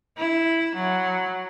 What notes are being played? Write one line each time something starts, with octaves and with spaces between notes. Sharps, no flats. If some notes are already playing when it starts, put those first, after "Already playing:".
E4
F#3